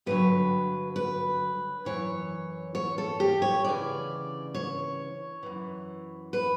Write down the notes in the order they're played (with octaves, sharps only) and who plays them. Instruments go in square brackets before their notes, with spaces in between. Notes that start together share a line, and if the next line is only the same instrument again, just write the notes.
[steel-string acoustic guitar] G2 D3 F#3 B4
B4
F#2 E3 C#5
C#5
A4
G4
C#5
D2 C#3 E3 D5
C#5
F#2 E3
B4